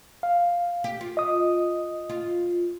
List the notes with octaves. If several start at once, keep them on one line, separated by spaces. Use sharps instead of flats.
F5
G4
F4
D#5 D#6
F4